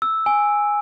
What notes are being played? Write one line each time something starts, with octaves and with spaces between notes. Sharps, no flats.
E6
G#5